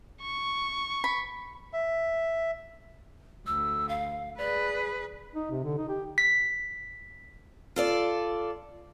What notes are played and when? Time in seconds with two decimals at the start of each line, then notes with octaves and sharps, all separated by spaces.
0.22 C#6
1.04 B5
1.73 E5
3.47 D2 E6
3.89 F5
4.38 G#4 B4 D5
5.35 D#4
5.51 C3
5.64 D3
5.77 D#4
5.89 G4
6.18 B6
7.76 F4 A4 D5